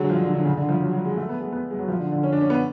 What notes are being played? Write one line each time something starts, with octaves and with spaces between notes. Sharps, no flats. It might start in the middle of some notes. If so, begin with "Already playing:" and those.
Already playing: D3 F#3 G#3
F3
D3
D3
C#3
D3
F3
F#3
F#3
G#3
A3
B3
G#3
B3
G#3
F#3
F3
D3
D3
C#4
D4
C#4
B3